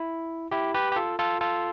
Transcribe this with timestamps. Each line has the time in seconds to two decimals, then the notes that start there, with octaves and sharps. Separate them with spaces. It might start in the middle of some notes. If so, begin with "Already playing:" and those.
Already playing: E4
0.51 E4 G4
0.74 G4 B4
0.92 G4
0.96 F4 A4
1.19 F4 A4
1.41 F4 A4